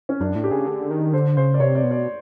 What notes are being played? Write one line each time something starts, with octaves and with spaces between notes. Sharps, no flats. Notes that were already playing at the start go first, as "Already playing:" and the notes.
C#4
F#2 D4
A2
G4
C#3 G#4
G4
D3 G#4
D#3
D3 C5
C#3 C5
D5
C3 C#5
D5
B2
D5